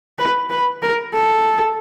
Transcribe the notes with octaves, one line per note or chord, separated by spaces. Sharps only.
B4
B4
A#4
A4